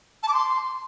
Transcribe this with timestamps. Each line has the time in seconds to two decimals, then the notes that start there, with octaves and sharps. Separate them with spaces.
0.23 A5
0.28 D6
0.34 C6